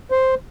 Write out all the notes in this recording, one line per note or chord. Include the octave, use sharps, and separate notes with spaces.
C5